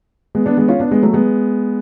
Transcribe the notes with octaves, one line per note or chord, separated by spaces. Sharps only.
G#3 B3
B3 D4
G#3 B3
C#4 F4
B3 D4
G#3 B3
F#3 A3
G#3 B3